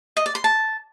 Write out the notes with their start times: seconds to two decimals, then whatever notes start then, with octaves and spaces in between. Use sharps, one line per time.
0.17 D#5
0.26 D5
0.35 C6
0.44 A5